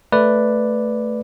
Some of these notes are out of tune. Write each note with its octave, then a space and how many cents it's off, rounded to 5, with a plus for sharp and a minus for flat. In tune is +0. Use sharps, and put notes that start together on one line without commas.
A3 +0 B4 +0 D5 +0